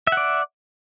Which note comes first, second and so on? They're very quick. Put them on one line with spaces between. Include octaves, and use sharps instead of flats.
E5 F#5 D5